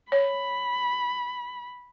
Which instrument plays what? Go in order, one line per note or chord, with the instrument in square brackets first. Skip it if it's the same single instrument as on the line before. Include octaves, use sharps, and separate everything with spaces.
[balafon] C#5 [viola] B5